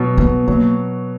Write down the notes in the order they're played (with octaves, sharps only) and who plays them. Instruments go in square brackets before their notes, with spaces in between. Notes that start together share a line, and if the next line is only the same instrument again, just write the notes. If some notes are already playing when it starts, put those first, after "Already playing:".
Already playing: [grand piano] B2 F#3
[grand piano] B2 [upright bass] B3
[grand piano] F#3 [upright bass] A#3